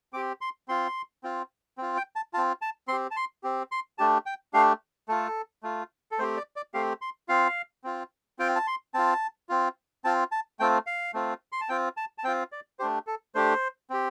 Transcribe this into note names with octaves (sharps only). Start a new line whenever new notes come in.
C4 G4 D6
C6
C4 F4 C6
C4 F4
C4 F4
G5
A5
C4 F4 A5
A5
C4 G4 C6
A5
C6
C4 G4
C6
A3 D4 G4 A5
G5
A3 D4 G4 F5
A3 F4 A4
A3 F4
A4
A3 C4 G4 C5
D5
D5
A3 C4 G4 F5
C6
C4 F4 F5
C4 F4
C4 F4 G5
A5
C6
C4 F4 A5
C4 F4
C4 F4 A5
A5
A3 C4 F4 G5
F5
A3 C4 F4
C6
A5
C4 F4 G5
A5
A5
C4 F4 G5
D5
A3 D4 G4 C5
A4
A3 D4 G4 C5
C4 G4